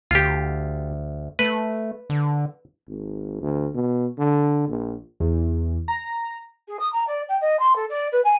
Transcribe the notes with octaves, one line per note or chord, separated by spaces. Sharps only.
D2 F4 G4
A3 B4
D3
G#1
D2
B2
D3
A#1
E2
A#5
G#4
D#6
A#5
D5
G5
D#5
C6
A4
D5
B4
G#5